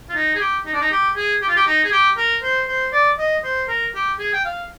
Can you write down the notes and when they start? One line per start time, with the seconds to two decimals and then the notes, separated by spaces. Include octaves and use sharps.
0.09 F4
0.15 D#4
0.35 G#4
0.40 G4
0.66 D#4
0.73 D4
0.81 D#4
0.91 G4
1.16 G#4
1.41 G4
1.48 F4
1.56 G4
1.66 D#4
1.84 G#4
1.92 G4
2.17 A#4
2.43 C5
2.68 C5
2.92 D5
3.18 D#5
3.44 C5
3.68 A#4
3.94 G4
4.19 G#4
4.33 G5
4.45 F5